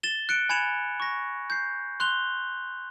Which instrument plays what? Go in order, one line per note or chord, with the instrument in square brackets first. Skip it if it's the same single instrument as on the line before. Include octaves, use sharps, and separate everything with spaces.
[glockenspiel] A6 E7 G7
F#6 C#7 D7
G#5 B5 G#6 C#7 E7 F7
C#6 A#6
G6 C7
C6 F#6 F7 G7